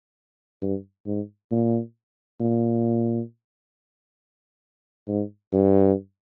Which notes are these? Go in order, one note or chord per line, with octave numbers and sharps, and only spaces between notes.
G2
G#2
A#2
A#2
G#2
G2